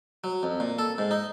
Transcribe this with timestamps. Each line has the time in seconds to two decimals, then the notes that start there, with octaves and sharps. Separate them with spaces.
0.24 F#3
0.43 F2
0.60 A#2
0.79 A4
0.98 G#2
1.11 D#4